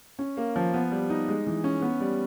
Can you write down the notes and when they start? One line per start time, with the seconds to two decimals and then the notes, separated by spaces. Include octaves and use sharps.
0.19 C#4
0.37 A#3
0.56 F3
0.74 B3
0.91 G3
1.10 D#4
1.28 G#3
1.47 E3
1.64 C#4
1.82 B3
2.00 G3